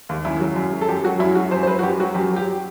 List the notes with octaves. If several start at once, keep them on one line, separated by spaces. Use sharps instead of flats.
D#2
F#2 E4
F#3
F#2
F#3
A4
F#2 G4
F#3 F#4
F#2 E4
F#3 F#4
F#2 C5
C5
F#3 B4
F#4
F#2 G4
F#3 F#4
F#2 G4
F#3
G4